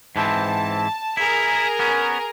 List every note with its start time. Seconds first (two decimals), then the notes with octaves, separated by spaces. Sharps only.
0.16 G#2 E3 C4 A5
1.17 E4 G#4 A#4 A#5
1.79 B3 C#4